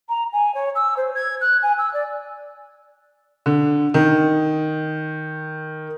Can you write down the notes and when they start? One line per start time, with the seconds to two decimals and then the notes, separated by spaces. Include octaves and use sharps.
0.09 A#5
0.33 G#5
0.54 C#5
0.75 E6
0.97 C5
1.15 G#6
1.41 F#6
1.62 G#5
1.78 E6
1.93 D5
3.46 D3
3.94 D#3